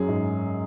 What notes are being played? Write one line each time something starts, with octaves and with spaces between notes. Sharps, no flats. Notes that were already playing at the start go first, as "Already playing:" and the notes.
Already playing: F#2 F#3 C#4 G#4
G#2